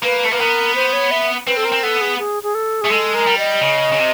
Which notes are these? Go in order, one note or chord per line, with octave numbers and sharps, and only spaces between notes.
A#3 B4
A3
A#3 B4
B3 A#4
C5
C#5
E5
C4 B4
A4
A#4
C4
B3 A4
G#4
G#4
G#4
A4
A3 G#4
G#3 A4
A#4
G3
D#5
C#3
C#3
C3